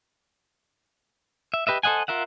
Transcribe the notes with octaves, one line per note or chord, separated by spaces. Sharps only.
E5
G4 B4 D#5 E5
A4 C5 D#5 F#5 G#5
F4 A#4 E5 F#5